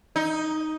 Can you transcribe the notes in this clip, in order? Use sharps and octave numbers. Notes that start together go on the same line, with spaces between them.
D#4